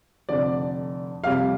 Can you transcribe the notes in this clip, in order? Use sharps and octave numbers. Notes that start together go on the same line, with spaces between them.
F1 F2 D3 D5
F2 C3 G3 F5